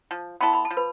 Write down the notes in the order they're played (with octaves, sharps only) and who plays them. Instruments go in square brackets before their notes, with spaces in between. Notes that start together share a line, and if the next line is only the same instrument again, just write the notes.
[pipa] F3
[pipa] B3 E4 A4 [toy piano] C6
[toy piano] B5
A5
[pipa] F3
[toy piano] B4 B5